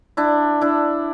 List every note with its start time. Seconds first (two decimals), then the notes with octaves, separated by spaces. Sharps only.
0.17 D4 E4
0.61 D4 E4